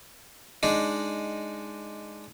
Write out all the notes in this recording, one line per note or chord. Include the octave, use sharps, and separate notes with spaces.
G#3 D4 D#4